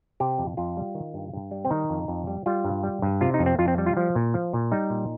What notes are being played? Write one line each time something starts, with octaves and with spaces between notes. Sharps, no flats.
C3 G4
F2
F2 F4
G3
D#3
G2
G2
G3
C4
D#3 D#4
F2
F2
G3
G3 F4
G2
G3
G2
C3 F4
D#4
F2
C4
F2 F4
C4
G3
F4
F3
A#2
F3
A#2
G3 D#4
A#2